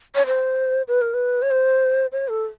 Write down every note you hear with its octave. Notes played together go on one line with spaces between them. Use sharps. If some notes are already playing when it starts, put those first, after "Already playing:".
C#5
C5
B4
A#4
B4
C#5
C5
C#5
A4